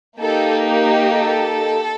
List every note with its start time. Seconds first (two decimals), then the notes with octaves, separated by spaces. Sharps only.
0.21 A#3 D#4 G4 A4
1.14 A4